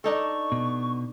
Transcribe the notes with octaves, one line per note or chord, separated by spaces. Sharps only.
D4 D#4 A4 C#6
B2